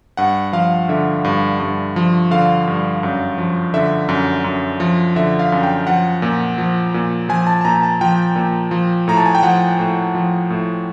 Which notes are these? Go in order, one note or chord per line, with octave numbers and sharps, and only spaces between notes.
G2 F#5
F3 F5
D3 E5
G2
G2
F3
D3 F5
G2
F#2
F3
D3 E5
F#2
F#2
F3
D3 E5
F5
F#2
G5
F3 F#5
A#2
F3
A#2
F3 G#5
A5
A5
A#2 A#5
A5
F3 G5
A#2
F3
A2 A#5
A5
G#5
G5
F3 F#5
A2
F3
A2